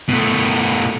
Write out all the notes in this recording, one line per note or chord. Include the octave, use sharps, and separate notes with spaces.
B2 A3